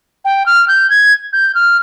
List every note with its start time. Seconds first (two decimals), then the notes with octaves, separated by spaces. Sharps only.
0.25 G5
0.46 F6
0.68 G6
0.90 G#6
1.33 G6
1.55 F6